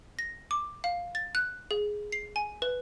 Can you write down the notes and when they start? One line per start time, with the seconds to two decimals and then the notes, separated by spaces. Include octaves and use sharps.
0.19 A#6
0.51 D6
0.84 F5
1.15 A6
1.35 F#6
1.71 G#4
2.12 C7
2.36 G#5
2.62 B4